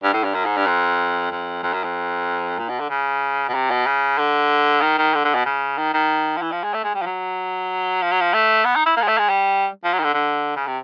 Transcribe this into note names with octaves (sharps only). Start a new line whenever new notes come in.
G2
A2
G2
F#2
G#2
G2
F2
F2
F2
F#2
F2
A#2
B2
D3
C#3
B2
C3
B2
C#3
D3
D#3
D#3
D3
D3
B2
C#3
D#3
D#3
F3
E3
F3
G#3
A3
G#3
G3
F3
F#3
F3
F#3
F3
A3
B3
D#4
E4
A#3
G#3
A3
G#3
G3
F3
F#3
D#3
D3
D3
C#3
C3